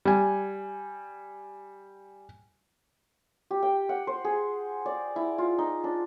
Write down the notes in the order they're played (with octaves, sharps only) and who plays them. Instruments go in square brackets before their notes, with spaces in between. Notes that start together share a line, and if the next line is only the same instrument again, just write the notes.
[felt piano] G3 G#5
[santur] G4
G5
F#5
C5
G#4
D5
E4
F4
D#4
D4